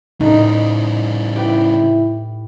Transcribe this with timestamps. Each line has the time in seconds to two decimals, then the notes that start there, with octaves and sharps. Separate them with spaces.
0.21 A2 C#3 G3 D#4
1.36 E4 G4 B4 G5